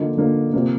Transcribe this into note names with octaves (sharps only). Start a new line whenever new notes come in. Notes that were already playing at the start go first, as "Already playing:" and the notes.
Already playing: D3 F3 A#3 D#4
D3 F3 A#3 D#4
C3 F3 A#3